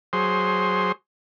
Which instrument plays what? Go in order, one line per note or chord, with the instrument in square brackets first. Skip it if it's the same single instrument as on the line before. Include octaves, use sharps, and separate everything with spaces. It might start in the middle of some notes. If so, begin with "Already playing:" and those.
[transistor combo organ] F#3 G#4 C5 C6